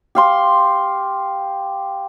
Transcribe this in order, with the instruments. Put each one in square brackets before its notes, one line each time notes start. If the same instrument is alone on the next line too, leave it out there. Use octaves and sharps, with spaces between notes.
[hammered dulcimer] G4 F5 C6